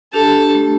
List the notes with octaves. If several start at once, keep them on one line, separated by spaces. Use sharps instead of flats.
D4 G4 A4
A3